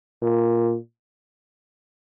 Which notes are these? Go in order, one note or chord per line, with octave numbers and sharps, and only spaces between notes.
A#2